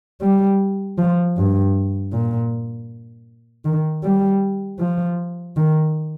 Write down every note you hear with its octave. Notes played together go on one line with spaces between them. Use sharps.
G3
F3
G2
A#2
D#3
G3
F3
D#3